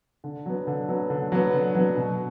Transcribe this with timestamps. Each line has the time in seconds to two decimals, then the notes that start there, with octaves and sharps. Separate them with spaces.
0.24 D3
0.46 F#3 B3
0.67 D3
0.89 F#3 B3
1.10 D3
1.32 F#3 B3
1.54 D3
1.75 F#3 B3
1.97 B2